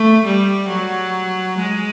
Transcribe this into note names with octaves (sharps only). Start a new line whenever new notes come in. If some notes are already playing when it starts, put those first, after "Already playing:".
Already playing: A3
G3
F#3
G#3